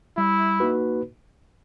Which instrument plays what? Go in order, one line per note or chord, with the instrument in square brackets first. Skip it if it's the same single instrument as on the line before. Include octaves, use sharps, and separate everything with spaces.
[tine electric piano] G3 [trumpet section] E4
[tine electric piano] A#3 D#4 F#4 B4